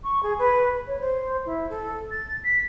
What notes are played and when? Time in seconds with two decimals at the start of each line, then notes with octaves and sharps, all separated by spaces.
0.04 C#6
0.23 G#4
0.39 B4
0.87 C#5
1.00 C5
1.45 E4
1.70 A4
2.11 A6
2.44 B6